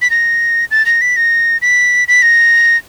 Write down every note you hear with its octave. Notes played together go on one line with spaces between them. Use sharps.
B6
A#6
A6
A#6
B6
A#6
B6
B6
A#6